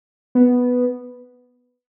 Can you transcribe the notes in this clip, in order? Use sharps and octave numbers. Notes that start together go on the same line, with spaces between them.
B3